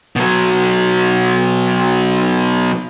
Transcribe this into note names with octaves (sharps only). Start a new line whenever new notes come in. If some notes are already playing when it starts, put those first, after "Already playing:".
B2 F#3